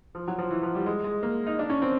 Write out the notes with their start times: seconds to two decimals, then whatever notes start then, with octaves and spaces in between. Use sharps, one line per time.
0.15 F3
0.28 F#3
0.38 F3
0.51 E3
0.63 F3
0.75 G3
0.86 G#3
1.04 G#3
1.23 A#3
1.46 D#4
1.59 D4
1.70 C#4
1.82 C4